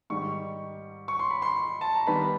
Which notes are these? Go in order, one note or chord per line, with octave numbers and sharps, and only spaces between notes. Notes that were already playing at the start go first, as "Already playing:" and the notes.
G#2 D#3 G3 C#6
C#6
C6
B5
C6
A5
A#5
D#3 G3 B3 B5